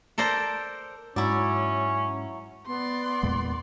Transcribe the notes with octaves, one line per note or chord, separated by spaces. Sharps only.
A4 A#4 C5 D5 A#5
G#2 F#3 C#4 E4 D5
B3 D5 C6
E2 A#2 G#3